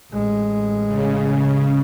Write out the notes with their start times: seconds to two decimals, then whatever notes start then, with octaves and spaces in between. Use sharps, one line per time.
0.11 A1 G#3
0.85 C#3